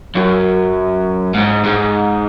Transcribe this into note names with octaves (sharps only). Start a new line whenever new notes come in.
F#2
G#2
G#2